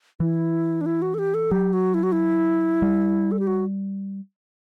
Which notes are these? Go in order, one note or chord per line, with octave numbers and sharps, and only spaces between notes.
E3 E4
D4
E4
F#4
A4
G4
A4
F#3 G4
F#4
E4
F#4
E4
G3
A4
G4
F#4